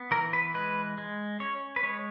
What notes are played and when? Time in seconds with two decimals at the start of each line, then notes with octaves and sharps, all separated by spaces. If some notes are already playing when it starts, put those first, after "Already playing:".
Already playing: B3
0.11 E3 A#4
0.33 B4
0.54 G#3 B4
0.98 G#3
1.40 C#4 C#5
1.76 B4
1.83 G#3 C#5